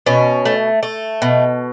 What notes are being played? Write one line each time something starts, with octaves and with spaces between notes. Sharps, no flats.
B2 C#4
A3
A3
B2